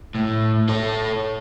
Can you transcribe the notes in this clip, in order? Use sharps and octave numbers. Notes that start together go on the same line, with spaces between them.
A2
A4 C#5